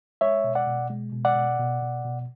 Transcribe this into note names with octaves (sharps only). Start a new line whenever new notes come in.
G#3 C#5 E5
B2
D5 F#5
B2
G#3
B2
D5 F#5
B2
B2
B2
B2